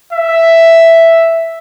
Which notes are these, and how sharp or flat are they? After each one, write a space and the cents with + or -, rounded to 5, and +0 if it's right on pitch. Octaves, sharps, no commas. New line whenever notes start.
E5 +5